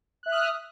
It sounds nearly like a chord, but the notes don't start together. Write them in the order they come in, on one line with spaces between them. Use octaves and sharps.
F#6 E5 F6 D#6